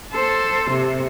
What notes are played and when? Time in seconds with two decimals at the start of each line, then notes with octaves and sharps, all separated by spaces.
0.12 A4 C5
0.71 C3